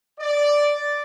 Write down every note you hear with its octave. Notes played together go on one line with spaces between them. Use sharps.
D5